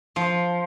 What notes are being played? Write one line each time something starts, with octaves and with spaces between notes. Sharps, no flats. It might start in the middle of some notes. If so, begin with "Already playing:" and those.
F3